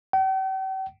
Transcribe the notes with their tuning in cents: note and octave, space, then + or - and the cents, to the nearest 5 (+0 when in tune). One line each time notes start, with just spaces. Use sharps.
G5 -45